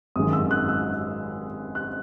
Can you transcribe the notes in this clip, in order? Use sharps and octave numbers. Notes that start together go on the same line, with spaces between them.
G#1 F#2 D#3 G#3 D#6
E6
F#6
E6
F#6